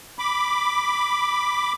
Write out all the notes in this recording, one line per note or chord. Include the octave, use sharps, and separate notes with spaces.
B5 D6